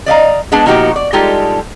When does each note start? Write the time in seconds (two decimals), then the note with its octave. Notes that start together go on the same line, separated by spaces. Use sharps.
0.06 D5 D#5 F5 A#5
0.52 G#3 B3 D4 G#4 A5
0.66 A#2 F3 D#4 F#4 G4
0.96 D5
1.13 G3 G#3 D#4 F4 G4 A4